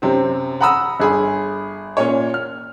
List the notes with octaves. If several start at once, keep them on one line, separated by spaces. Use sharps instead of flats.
F#2 C3 C4
F#5 A#5 B5 D#6 E6
G1 G#4 B5
A#2 C#4 C#5
F6